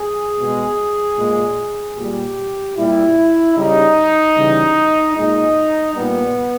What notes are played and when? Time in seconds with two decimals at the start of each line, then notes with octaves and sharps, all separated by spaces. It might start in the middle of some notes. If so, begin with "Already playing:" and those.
Already playing: G#4
0.38 B2 G#3
1.17 A#2 G#3
1.96 A#2 G3 G4
2.75 A#2 G3 E4
3.55 C#3 G3 D#4
4.35 C#3 E3 G3
5.14 A#2 G#3 D#4
5.94 A#2 G3 B3